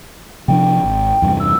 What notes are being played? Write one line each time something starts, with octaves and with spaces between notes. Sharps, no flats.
C3 F3 D4 G5
G#1
E2 G2 C3
E6